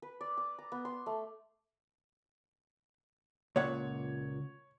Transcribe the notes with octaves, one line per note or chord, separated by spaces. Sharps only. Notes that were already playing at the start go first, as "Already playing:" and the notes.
B4
D5
D6
A#5
B3
C6
A3
C#2 A#2 C#5 F#5